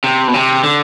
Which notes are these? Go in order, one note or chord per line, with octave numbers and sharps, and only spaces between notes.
C3
B2
C3
D3